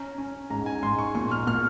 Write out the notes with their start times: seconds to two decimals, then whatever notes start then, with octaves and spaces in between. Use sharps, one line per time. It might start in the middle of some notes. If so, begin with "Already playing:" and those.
Already playing: C#4 A#5
0.18 C#4
0.50 G#2 A#5
0.66 G#5
0.83 G#2 C6
0.99 C#6
1.15 A#2 C#6
1.31 F6
1.47 A#2 F6